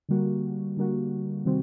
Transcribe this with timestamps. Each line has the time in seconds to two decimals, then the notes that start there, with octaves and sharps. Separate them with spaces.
0.09 D3 G3 A#3 F#4
0.77 D3 G3 A#3 F#4
1.45 C3 D#3 G3 C4 F#4